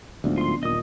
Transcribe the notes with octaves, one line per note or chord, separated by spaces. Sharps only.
D1 D2 G#2 F3 B3 D4
F4 C6
D#1 A#2 D#5 D#6